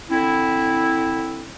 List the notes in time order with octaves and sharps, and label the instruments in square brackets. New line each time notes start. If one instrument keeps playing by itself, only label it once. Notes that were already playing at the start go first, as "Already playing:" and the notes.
[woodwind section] D3 C4 E4